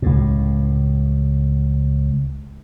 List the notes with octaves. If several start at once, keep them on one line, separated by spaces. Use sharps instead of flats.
C#2 A2